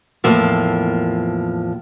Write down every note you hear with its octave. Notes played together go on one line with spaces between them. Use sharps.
E2 A2 F3 A#3